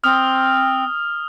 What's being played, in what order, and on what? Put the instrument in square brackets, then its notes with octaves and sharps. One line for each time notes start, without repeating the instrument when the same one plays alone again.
[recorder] C4 [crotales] D#6 F6